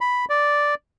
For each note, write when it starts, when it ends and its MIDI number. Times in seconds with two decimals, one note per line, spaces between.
0.01 0.25 83
0.29 0.74 74